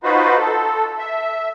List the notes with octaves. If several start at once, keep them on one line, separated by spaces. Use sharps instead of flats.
D#4 F4 F#4 B4 C5
A4
E5